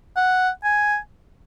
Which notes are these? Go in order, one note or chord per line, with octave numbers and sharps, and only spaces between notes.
F#5
G#5